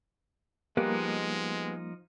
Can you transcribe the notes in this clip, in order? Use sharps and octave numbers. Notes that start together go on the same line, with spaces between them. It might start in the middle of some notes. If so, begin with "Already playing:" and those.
F3 G3 G#3 A#3 B3 D#4 G4 F#6